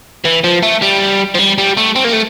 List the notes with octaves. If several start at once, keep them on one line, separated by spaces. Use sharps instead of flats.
E3
F3
A3
G3
F3
G3
G3
A3
C4
A#3
A3